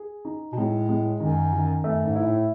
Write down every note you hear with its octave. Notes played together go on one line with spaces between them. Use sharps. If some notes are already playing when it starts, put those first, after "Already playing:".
Already playing: G#4
D#4
B2
A2 G#3
G#3
F#2 D#3
D#3
F#2 A3
G#2
E4
A2